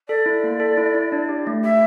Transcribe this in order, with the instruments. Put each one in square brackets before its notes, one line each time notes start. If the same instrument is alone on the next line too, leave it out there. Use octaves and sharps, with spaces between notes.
[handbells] A4 [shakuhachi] D5
[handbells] E4
A#3
A4
E4
E4
D4
G4
A3
[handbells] G4 [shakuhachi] E5